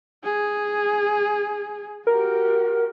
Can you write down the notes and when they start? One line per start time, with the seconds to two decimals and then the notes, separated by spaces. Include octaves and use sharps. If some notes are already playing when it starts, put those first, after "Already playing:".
0.24 G#4
2.07 F#4 G4 A#4